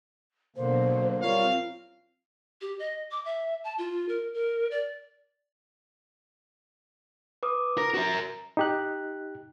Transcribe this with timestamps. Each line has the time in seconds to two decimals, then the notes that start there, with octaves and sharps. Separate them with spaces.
0.56 B2 D3 F#3 A#3 C5
1.22 G3 C4 F4 A#4 C#5 F5
2.61 G4
2.79 D#5
3.11 D6
3.25 E5
3.64 A5
3.78 F4
4.09 A#4
4.34 A#4
4.71 D5
7.43 B4 D6 D#6
7.78 A#4 A#6
7.94 F#4 A#4
8.57 D#4 G4 F#6